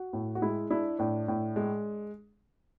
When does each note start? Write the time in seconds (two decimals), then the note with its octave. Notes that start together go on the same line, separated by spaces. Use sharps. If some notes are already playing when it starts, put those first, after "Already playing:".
Already playing: F#4
0.13 A2
0.35 F#4
0.42 G#3 E4
0.70 D4 E4
0.99 A2 D4
1.28 A2
1.56 G#3